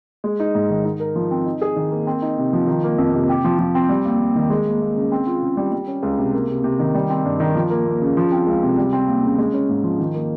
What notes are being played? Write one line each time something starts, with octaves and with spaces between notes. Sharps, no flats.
G#3
D#4
G#2
D#3
D#4
A#4
F3
C4
D#4
G#4
D#3
A#3
C4
D#4
C3
F3
D#3
A#3
F2
C3
G4
F3
F3
C4
G3
D#2
D#2
D#3
G#3
D#2
D#2
C#3
C4
F4
C#3
G3
G3
C#4
C#2
C3
A#3
C3
C3
D#3
G3
C4
G2
D#3
F3
A#3
D#2
C#3
F3
C4
C#2
C3
G3
C4
D#2
C#3
G#3
C#4
G#2
F3
D#3
A#3